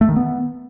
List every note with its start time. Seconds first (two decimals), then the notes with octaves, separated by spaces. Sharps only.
0.01 A3
0.09 D#3
0.16 B3